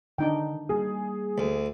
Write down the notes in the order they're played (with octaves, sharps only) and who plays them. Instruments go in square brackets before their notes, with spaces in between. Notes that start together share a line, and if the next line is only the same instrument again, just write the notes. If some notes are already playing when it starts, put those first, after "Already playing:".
[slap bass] D3 D#3 [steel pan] D4 D#4 G5
[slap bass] G3 A#3 [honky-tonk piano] G#4
[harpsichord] D2